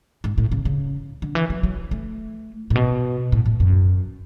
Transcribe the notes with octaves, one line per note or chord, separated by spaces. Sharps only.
G#2
A2
C#3
C#3
D3
E3
F#3
F#3
A3
A2
B2
A2
A2
F#2